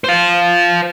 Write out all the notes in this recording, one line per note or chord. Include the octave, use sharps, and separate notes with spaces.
C5 F5